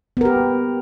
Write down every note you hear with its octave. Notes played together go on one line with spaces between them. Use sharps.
B3 G4 A#4